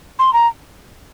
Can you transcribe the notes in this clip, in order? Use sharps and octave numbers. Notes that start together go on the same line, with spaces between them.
C6
A#5